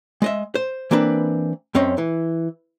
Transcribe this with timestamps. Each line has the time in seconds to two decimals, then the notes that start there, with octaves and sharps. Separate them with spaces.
0.22 G#3 D#5 E5
0.55 C5
0.91 E3 A#3 C4 D4 B4
1.75 F#2 C4 C#4 D#5
1.98 E3